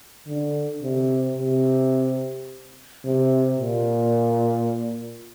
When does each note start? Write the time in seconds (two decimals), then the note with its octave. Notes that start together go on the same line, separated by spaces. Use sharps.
0.28 D3
0.83 C3
1.38 C3
3.06 C3
3.60 A#2